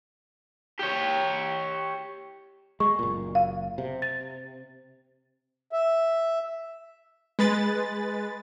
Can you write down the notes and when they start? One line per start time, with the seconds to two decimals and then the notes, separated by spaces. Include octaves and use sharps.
0.79 G4 C#5
2.80 G#3 C#6
2.99 F#1 A#2
3.35 F5
3.78 C3
4.02 A6
5.72 E5
7.39 G#3 B4 A6